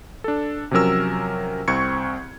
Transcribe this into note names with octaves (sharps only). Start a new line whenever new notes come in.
D4 A4
C3 F3 F#3 C#4 A#4 E6
C2 C4 C#6 G#6 C#7